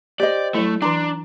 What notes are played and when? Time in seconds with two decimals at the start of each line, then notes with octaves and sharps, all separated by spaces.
0.20 G4 C5 D5 D#5
0.55 F#3 A3 E4
0.82 E3 D4 A#5 C6 D6